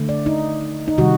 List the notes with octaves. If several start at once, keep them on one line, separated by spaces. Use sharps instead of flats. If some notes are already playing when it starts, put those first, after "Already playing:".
Already playing: D3 A3
D5
D#4
D#4
C3 D#3 G3 F#4